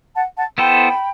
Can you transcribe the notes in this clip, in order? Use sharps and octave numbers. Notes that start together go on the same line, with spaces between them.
F#5 A5
F#5 A5
B3 E4 A4 C5 G5 B5